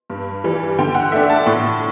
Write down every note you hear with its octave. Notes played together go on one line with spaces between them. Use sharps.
G2
E3 G3
D3 G5
F#5
A3 D4 E5
A5
A2